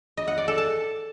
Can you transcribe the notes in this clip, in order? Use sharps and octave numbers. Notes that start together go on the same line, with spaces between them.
D#5
F#5
D5
A4
A5